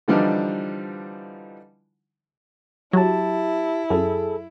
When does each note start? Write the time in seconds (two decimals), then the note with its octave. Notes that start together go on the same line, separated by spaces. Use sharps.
0.08 D3 E3 F3 G3 D4 D#4
2.93 F#3 E4 G4 A5
3.90 F#2 G#4 A4